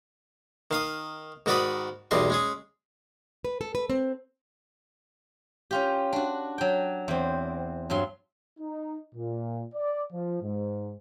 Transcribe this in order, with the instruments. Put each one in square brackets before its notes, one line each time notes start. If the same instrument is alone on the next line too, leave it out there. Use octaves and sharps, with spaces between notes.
[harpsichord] D#3 F5 D#6
G#2 D#3 F#4 D5 B5 D#6
B1 E2 G3 D#5 C6
G#3 C#4 G#4
[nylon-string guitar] B4
A4
B4
C4
[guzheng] C#4 F4 G4
D4 F#4
F#3 G5
E2 C4
G2 F#3 C6
[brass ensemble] D#4
A#2
D5
F3
G#2